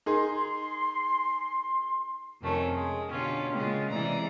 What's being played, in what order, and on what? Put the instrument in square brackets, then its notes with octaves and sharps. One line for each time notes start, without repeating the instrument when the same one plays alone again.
[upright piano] D#4 G#4 A#4 [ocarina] C6
[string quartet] F2 C3 D#3 A3 C#4
G#3
B2 D3 C#4 F4 G4
A#2 C#3 G#3 B3 C#4 F4
C3 E3 G#3 D5 A#5